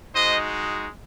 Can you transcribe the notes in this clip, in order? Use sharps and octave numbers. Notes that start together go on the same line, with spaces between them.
G#3 D#4 F#4 C5 D#5